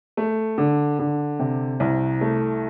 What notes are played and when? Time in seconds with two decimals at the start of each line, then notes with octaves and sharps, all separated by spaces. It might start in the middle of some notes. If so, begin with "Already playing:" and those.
0.17 A3
0.58 D3
0.99 D3
1.39 C3
1.80 C2
2.21 A3